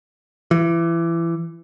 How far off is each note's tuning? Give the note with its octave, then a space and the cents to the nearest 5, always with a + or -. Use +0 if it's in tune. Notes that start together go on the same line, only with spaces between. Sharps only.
E3 +25